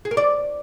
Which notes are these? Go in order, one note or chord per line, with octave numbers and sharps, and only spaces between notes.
G#4
A#4
D5